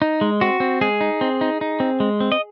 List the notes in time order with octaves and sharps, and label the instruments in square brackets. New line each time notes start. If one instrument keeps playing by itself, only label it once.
[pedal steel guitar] D#4
G#3
C4 F#4
C4
G#3 G#4
D#4
C4
D#4
D#4
C4
G#3
C4
D#5